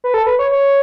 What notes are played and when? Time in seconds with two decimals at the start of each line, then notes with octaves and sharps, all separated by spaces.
0.04 B4
0.14 A4
0.26 B4
0.39 C#5
0.51 C#5